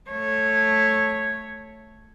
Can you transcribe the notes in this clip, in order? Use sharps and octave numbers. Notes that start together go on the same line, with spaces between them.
A3 C#5